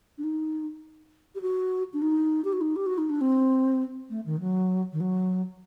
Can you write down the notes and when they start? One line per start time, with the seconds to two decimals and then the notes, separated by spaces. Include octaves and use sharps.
0.18 D4
0.23 D#4
1.35 G4
1.41 F#4
1.93 D4
2.01 D#4
2.44 G4
2.52 F#4
2.61 D#4
2.76 G4
2.86 F#4
2.97 D#4
3.09 D4
3.21 C4
4.09 A3
4.25 D#3
4.40 F#3
4.92 D#3
5.00 F#3